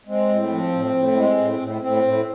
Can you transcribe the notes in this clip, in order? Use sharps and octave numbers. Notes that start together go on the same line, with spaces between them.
G#3 C4
A2
F3
A2
A2
G#3
A2
A2
A2 C4
A2